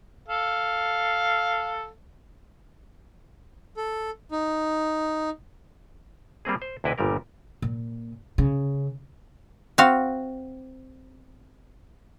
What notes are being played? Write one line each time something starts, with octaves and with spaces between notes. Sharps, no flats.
A4 F5
A4
D#4
G3 A#3 C4 G#4
C5
D2 C3 E4 B4 D#5
G1 A#2 G3 A#4
A#2
C#3
C4 F#4 F5